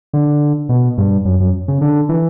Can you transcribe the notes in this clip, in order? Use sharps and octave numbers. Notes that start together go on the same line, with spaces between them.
D3
B2
G2
F#2
F#2
C#3
D3
E3